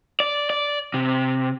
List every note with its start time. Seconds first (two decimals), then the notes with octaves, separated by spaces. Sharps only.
0.20 D5
0.50 D5
0.94 C3